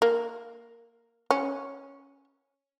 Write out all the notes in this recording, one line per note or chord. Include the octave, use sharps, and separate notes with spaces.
A#3
C#4